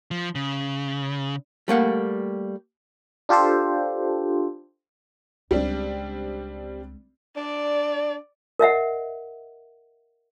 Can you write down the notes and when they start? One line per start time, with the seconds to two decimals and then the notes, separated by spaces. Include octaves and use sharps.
0.11 F3
0.35 C#3
1.68 G3 A3 A#3 F#5
3.29 D4 F4 G4 A4 C5
5.51 C#2 G3 G#3 C4 D4
7.37 D4 D5
8.59 A#4 D#5 E5 F#5